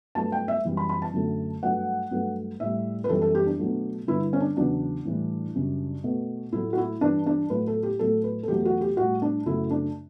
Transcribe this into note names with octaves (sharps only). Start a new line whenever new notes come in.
G2 F#3 A3 A5
G5
E5
F#2 E3 G3
B5
B5
A5
F#2 D3 F#3 A3
G2 F#3 A3 F#5
G2 F#3 A3
A2 G3 E5
B4
F#2 E3 G3 A4
A4
G4
D4
B2 F#3 A3
G2 D3 G3 E4
C#4
D4
E2 C#3 F#3 D4
A2 E3 G3
F#2 C#3 G3
B2 A3
A2 F#3 A3 E4
F#4
E4
G2 E3 G3 D4
D4
A2 F#3 A3 B4
A4
G4
A2 F#3 A3 A4
B4
A4
E2 B2 F#3 A3 G4
F#4
G4
A2 G3 F#4
D4
F#2 C#3 F#3 A3 E4
D4